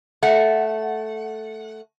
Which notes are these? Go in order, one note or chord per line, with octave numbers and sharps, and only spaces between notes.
A3 F#5